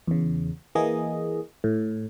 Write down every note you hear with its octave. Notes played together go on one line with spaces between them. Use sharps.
E2 C#3
E3 A#3 G#4 D#5
A2